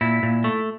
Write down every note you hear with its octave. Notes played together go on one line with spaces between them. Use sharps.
A#2 E4
A#2
A3